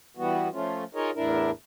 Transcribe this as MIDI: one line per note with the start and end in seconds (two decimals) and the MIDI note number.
0.17 0.49 52
0.17 0.49 55
0.17 0.49 59
0.17 0.49 66
0.52 0.84 53
0.52 0.84 57
0.52 0.84 61
0.52 0.84 65
0.95 1.11 63
0.95 1.11 65
0.95 1.11 68
0.95 1.11 70
0.95 1.11 73
0.95 1.11 75
1.15 1.51 40
1.15 1.51 45
1.15 1.51 62
1.15 1.51 64
1.15 1.51 70